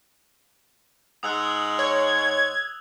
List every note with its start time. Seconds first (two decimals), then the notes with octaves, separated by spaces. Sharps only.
1.23 G#2 G#3 F#5 D#6 E6 F#6
1.79 C#5 G#6